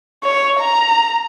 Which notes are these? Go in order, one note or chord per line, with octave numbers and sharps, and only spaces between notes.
C#5
A#5